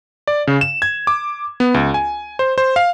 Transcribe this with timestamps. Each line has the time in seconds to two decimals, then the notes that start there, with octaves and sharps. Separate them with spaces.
0.27 D5
0.47 C#3
0.61 E7
0.82 G#6
1.07 D6
1.60 B3
1.74 C#2
1.94 G#5
2.39 C5
2.58 C5
2.76 F5